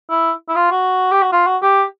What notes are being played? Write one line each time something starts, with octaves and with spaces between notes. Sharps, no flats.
E4
E4
F4
F#4
G4
F#4
F4
F#4
G4